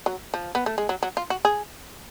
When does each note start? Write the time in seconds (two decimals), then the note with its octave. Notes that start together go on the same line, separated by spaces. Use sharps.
0.06 F#3
0.34 F3
0.55 B3
0.66 A3
0.78 G#3
0.89 F#3
1.03 F#3
1.17 F4
1.30 F#4
1.45 G#4